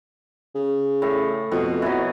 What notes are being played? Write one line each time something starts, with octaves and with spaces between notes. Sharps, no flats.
C#3
A2
F2 B2
E3 F#3